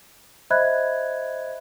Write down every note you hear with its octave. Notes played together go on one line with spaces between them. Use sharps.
C5 D#5 E5 B5 F#6 G#6